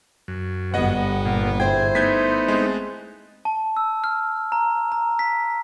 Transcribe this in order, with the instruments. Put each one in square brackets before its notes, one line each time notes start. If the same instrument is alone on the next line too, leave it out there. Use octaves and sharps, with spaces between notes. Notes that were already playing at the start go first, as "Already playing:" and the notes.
[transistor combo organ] F#2
[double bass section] G1 [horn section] G3 B3 [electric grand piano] D#5 F#5
[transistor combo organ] A#2
[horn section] E4 C5 [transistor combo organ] G#4 [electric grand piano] G5
[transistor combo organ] A3 B3 D#4 [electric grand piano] G6 G#6 B6
[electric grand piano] G#3 C4
[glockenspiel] A5
E6
F6
A#5
A#5
B6